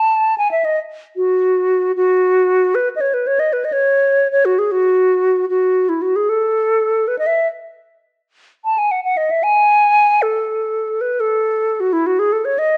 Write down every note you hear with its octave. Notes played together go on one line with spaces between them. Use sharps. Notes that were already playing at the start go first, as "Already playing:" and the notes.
Already playing: A5
G#5
E5
D#5
F#4
F#4
B4
D#5
C#5
B4
C#5
D#5
B4
D#5
C#5
C#5
F#4
G#4
F#4
F#4
E4
F#4
G#4
A4
B4
D#5
E5
A5
G#5
F#5
F#5
D#5
E5
G#5
A4
B4
A4
F#4
E4
F#4
G#4
A4
C#5
D#5